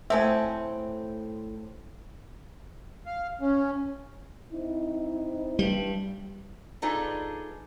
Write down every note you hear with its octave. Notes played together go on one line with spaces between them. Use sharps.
A2 F3 A3 C4 E5 F#5 G#5
F5
C#4
C4 D#4 E4
G2 G3
D4 D#4 F4 G#4 A4 B4